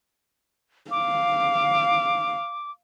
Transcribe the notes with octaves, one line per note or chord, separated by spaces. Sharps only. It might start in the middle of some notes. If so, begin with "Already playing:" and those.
F5 D6